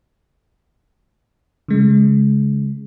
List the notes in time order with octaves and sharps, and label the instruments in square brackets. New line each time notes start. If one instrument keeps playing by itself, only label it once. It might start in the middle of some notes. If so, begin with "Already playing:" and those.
[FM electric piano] C#3 G#3